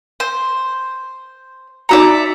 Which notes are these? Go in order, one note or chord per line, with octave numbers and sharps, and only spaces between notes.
C5
D#4 F#4 D5 E5 A#5 C#7